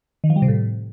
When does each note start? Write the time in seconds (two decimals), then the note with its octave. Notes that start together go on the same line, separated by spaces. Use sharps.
0.24 D#3
0.30 F3
0.36 G3
0.42 C3
0.48 A2